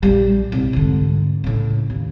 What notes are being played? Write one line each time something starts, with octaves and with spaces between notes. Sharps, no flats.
A#1 G3
C2 G2
G#2 D3
A2 C#3
D#2